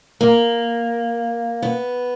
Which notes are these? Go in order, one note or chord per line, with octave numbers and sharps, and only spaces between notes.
A#3
B3